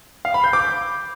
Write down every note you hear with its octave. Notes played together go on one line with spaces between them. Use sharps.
F5
B5
G6
D6